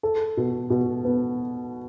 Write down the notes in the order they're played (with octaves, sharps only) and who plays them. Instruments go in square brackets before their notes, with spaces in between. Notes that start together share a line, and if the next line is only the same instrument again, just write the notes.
[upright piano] A4
B2
B2
B3